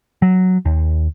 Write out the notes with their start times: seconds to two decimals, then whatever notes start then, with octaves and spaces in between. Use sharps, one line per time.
0.22 F#3
0.65 D#2